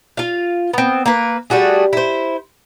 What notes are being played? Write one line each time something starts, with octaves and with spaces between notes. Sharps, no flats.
F4 F5
B3 C4
A#3 B4
G3 A3 F#4 G#4
E4 C5